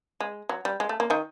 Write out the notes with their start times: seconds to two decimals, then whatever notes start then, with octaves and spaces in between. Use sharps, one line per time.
0.20 G#3
0.49 F#3
0.65 G3
0.80 G#3
0.89 A3
1.00 A#3
1.10 D#3 D#4